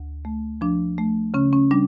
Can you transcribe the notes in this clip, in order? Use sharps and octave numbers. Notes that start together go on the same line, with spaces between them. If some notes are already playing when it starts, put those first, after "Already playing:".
Already playing: D2
A3
F3 D4
A3
C#3 C#4
C#4
G3 D4